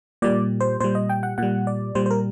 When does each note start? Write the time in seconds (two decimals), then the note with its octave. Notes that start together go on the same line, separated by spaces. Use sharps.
0.22 A#2 G3 D5
0.60 C5
0.80 A#2 G3 C5
0.95 D#5
1.09 G5
1.23 F#5
1.38 A#2 G3 F#5
1.67 D5
1.95 A#2 G3 C5
2.06 C5
2.10 A#4